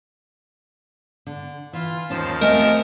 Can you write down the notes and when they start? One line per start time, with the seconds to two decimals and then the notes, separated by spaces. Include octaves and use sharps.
1.27 D3
1.73 E3 F4
2.10 D#2 F3 C#4 C5 A5
2.41 A3 C4 A#4 D#5 G#5